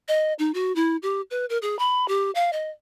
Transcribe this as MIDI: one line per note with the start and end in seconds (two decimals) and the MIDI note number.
0.08 0.33 75
0.39 0.51 63
0.54 0.74 66
0.75 0.96 64
1.02 1.21 67
1.31 1.46 71
1.49 1.58 70
1.62 1.78 68
1.79 2.08 83
2.08 2.31 67
2.35 2.50 77
2.53 2.70 75